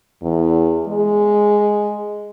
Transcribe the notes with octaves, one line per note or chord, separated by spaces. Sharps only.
E2
G#3